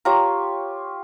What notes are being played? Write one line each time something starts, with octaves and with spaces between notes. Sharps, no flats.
F4 G4 A#4 C#5 A#5